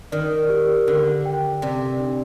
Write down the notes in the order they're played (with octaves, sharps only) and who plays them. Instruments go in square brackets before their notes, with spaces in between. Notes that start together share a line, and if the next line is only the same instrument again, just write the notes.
[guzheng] D#3 [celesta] D5
[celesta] G4
[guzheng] D3 [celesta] A#4
[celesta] G5
[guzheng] C3 [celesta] D5
[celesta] D4